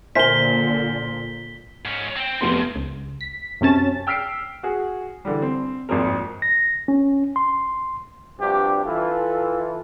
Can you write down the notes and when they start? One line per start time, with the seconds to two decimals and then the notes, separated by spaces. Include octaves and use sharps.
0.15 A#2 D3 A#4 C5 G#5 B6 G7
1.85 G#2 C#4
2.16 C4 G5
2.41 F1 G#2 F3 B3 C6
2.76 C#2
3.21 B6
3.61 F#2 C3 C#4 A5 A6
4.07 G5 E6 F6 B6 C7 D7
4.63 F#4 G#4
5.25 D3 E3 G3
5.42 C4
5.89 G#1 F2 A#3 C4 A#4
6.42 A#6
6.88 C#4
7.36 C6
8.39 G2 C3 F3 D4 F#4 G4
8.85 E3 F4 A4